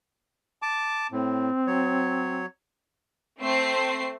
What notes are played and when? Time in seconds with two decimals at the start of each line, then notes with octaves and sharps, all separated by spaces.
0.62 A5 D6
1.12 A2 C4
1.67 F#3 C#5
3.41 A3 C4 C7